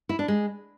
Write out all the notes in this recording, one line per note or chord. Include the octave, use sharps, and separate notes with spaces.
E4
D4
G#3